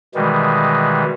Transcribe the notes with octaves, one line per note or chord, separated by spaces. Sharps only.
B2 D#3 E3 G3 G#3